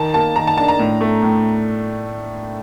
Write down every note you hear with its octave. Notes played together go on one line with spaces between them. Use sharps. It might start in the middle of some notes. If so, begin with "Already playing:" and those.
Already playing: D#3 A5
A#3 A5
D#3 A#5
A5
D4 A5
A#5
A2
A3
A2